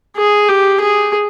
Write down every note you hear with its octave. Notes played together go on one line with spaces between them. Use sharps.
G#4
G4
G#4